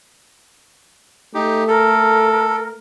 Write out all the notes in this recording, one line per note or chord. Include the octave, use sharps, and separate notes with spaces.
A3 D#4 G4
A4 A#4